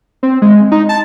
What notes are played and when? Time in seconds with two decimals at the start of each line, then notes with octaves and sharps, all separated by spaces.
0.23 C4
0.42 G#3
0.72 D#4
0.89 A5